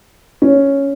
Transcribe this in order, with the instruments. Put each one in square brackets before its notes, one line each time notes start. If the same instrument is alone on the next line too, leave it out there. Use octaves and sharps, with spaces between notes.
[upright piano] C#4